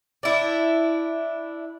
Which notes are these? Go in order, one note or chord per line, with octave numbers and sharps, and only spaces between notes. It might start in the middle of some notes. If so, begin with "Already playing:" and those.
D4 E4